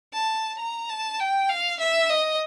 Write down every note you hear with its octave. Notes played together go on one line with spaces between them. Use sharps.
A5
A#5
A5
G5
F5
E5
D#5